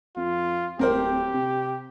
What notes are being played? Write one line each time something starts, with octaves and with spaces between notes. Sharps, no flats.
F2 F4
D1 C4 G4 A#4 C5
C3